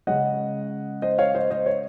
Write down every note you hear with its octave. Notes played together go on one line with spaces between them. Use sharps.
C#3 G#3 C#4 D#5 F#5
C5 D#5
C#5 F5
C5 D#5
C5 D#5
C#5